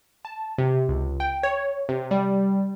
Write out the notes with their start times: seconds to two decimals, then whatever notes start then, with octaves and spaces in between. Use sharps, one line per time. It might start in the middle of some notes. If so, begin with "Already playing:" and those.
0.25 A5
0.58 C3
0.89 C#2
1.20 G5
1.43 C#5
1.89 C3
2.11 G3